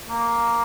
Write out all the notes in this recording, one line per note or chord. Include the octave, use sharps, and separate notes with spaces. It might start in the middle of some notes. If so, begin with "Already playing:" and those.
A#3